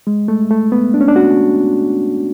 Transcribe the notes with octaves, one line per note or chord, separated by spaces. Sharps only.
G#3
A3
A3
B3
D4
C#4
D4
F#4